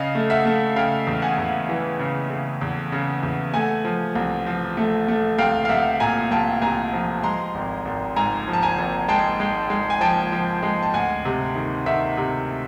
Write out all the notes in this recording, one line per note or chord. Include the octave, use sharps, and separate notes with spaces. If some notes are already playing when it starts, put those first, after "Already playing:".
Already playing: C#3 D#5 F5
A3
E5 F#5
A3
C#3 F5 G5
E2
F#5 G#5
E2
E3
C#3
C#3
E2
C#3
E2
A3 F#5 G#5
F3
C2
F3
A3
A3
C2 F5 G5
F5
C2 E5 F#5
A#2 G#5 A#5
C2 G5 A5
C2 G#5 A#5
F3
G#3 A#5 C6
G#1
G#1
G#2 G#5 A#5
F3
A5
G#5 A#5
G#1
G#3 G5 A5
G#3
G#3
G#5
F3 G5 A5
F3
G#3
A5
D2 F#5 G#5
C3
D#3
D#3 E5 F#5
C3